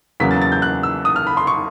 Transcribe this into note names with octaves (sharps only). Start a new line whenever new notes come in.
E2 C#3 F#3 A#3 B6
A6
A6
G6
F#6
E6
D#6
F6
B5
C6
C#6